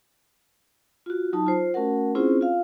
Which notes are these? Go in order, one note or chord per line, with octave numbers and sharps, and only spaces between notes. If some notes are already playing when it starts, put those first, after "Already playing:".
F4 F#4
F#3 D#4 A5
F4 C5
A3 C#4 F#4 A#4 F#5
C4 C#4 E4 F4 G#4 C5
F4 F5